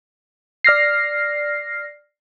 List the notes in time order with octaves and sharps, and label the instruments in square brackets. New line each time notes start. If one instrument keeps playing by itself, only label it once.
[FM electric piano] D5 F6 A#6 C7